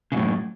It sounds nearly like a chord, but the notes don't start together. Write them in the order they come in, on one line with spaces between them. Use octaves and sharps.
C#3 F#2 A2